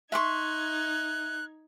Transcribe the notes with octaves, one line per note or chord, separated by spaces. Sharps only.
D#4 E5 C6 C#6 F#6 G#6